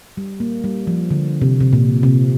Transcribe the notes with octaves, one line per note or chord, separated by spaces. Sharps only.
G3
A#3
G3
F3
D3
C3
C3
A#2
C3